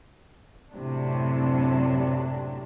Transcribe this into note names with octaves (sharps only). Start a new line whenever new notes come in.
F#2 A2 C3 F#3 D4